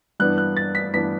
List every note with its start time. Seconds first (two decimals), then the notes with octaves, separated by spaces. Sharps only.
0.20 G2 E3 B3 D4 F#6
0.38 F#6
0.57 A6
0.75 B6
0.94 G2 E3 B3 D4 B6